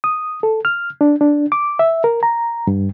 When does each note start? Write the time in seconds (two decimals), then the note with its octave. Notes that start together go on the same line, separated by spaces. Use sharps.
0.04 D#6
0.43 A4
0.65 F6
1.01 D4
1.21 D4
1.52 D6
1.79 E5
2.04 A#4
2.23 A#5
2.67 G2